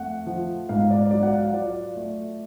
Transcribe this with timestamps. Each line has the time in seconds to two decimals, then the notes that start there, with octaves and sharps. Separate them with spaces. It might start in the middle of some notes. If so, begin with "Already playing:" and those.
Already playing: F2 A3 F#5
0.27 F3
0.69 G#2 F5
0.91 D5
1.11 F#3 D5
1.23 F#5
1.33 F5
1.54 F4 D5
1.96 A3